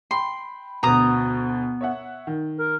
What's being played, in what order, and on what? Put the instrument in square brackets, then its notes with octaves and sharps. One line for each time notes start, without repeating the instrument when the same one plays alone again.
[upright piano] G5 B5 [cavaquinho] C6
[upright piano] D2 B2 [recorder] B3 [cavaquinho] A#5 D#6
[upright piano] C#5 E5 F#5
D#3
[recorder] A#4